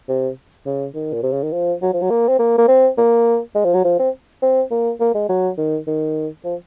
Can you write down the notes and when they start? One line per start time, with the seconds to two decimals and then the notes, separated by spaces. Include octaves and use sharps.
0.09 C3
0.66 C#3
0.94 D#3
1.13 A#2
1.23 C3
1.33 C#3
1.43 D#3
1.53 F3
1.82 F#3
1.93 F3
2.02 F#3
2.10 A#3
2.28 C4
2.39 A#3
2.58 A#3
2.68 C4
2.98 A#3
3.55 G#3
3.65 F3
3.74 F#3
3.85 F3
3.99 C4
4.42 C4
4.71 A#3
5.00 A#3
5.14 G#3
5.29 F#3
5.57 D#3
5.87 D#3
6.45 F3